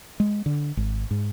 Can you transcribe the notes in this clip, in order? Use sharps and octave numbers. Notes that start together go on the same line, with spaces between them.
G#3
D3
G#1
G#2